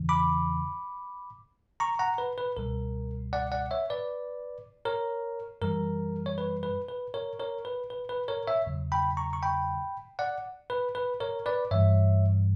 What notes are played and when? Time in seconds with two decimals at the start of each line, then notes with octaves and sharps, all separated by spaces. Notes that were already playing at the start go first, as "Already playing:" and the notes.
Already playing: E2 C#3 E3
0.09 B5 D6
1.80 A#5 C#6
1.99 F#5 A#5
2.18 B4
2.38 B4
2.57 C#2 B2 G3 A#4
3.33 D5 F#5
3.52 D5 F#5
3.71 C#5 E5
3.90 B4 D5
4.85 A#4 C#5
5.62 F#2 E3 G3 A#4
6.26 C#5
6.38 B4
6.63 B4
6.88 B4
7.14 A#4 C#5
7.39 A#4 C#5
7.65 B4
7.90 B4
8.09 B4
8.28 A#4 C#5
8.47 C#5 E5
8.66 E2 C#3 F#3
8.92 G5 B5
9.17 A#5 C#6
9.33 C#6
9.43 G5 B5
10.19 D5 F#5
10.70 B4
10.95 B4
11.20 A#4 C#5
11.46 B4 D5
11.71 G2 E3 G3 C#5 E5